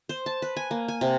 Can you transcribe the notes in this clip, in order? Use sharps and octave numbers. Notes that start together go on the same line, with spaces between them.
C5
A5
B4
G#5
A#3
G#5
C3